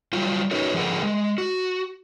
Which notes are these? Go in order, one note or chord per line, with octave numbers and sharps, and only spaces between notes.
F#3 G3 F4
C#4 D#4 F#4 A#4 B4 C#5
D3 F3 G#4 A#4 F#5
G#3
F#4